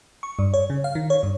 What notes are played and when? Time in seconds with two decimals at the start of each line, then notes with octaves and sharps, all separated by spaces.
0.23 C#6
0.39 G2
0.54 C#5
0.70 C#3
0.84 F5
0.95 D#3
1.10 C#5
1.23 G2